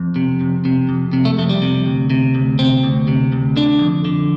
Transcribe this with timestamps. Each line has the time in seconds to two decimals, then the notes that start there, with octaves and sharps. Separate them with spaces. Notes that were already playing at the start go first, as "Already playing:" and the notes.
Already playing: F2
0.16 C3
0.41 F2
0.65 C3
0.89 F2
1.13 C3
1.25 A3
1.38 F2 A3
1.49 G3
1.62 C3
1.86 D2
2.10 C3
2.35 D2
2.59 C3 C4
2.83 D2
3.08 C3
3.32 D2
3.57 D3 D4
3.81 F2
4.05 D3